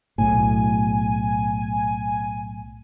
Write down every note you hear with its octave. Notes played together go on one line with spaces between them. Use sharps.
B1 A2 G#5